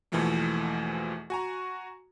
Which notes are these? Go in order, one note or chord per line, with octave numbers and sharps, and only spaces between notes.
E2 B2 E3 F3 A3 A#3
F#4 G#5 A#5